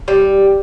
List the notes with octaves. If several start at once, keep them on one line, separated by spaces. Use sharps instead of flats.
G3